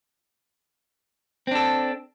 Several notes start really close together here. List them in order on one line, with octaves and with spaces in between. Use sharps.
C4 D4 A4